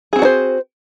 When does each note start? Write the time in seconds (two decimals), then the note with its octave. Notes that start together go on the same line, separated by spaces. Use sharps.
0.13 G#4
0.16 C4
0.19 F#4
0.22 D4
0.25 C5